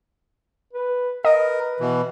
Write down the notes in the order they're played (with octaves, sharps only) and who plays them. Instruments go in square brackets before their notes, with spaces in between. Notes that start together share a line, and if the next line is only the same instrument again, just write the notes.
[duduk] B4
[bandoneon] A#4 [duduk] B4 [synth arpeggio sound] D#5
[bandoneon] B2 E3